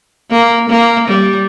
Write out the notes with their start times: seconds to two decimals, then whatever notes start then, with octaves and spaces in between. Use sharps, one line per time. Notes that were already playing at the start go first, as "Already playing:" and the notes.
0.31 A#3
0.69 A#3
1.09 G3